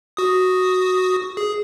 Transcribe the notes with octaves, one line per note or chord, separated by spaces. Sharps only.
F#4 D#6
G#4